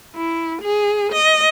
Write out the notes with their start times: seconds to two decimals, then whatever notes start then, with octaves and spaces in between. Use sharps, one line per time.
0.16 E4
0.62 G#4
1.13 D#5